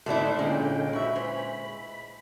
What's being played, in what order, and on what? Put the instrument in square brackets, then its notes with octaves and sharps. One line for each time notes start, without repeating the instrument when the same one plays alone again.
[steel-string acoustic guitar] G#2 D3 D5 [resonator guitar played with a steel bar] A3 D#4 E4 [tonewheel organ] F#5 C6
[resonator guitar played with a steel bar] A#2 [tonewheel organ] D3 C#4 G5 [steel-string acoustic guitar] G#3
[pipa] F#4 E5 [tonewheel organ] B5
[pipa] E3 C5 C#5